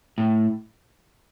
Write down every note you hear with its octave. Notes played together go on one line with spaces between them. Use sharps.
A2